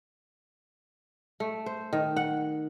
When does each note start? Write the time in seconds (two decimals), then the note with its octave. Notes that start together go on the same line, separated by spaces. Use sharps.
1.40 A3
1.66 C5
1.93 D#3
2.16 F#5